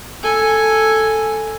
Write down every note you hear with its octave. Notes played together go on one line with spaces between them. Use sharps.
A4 G#5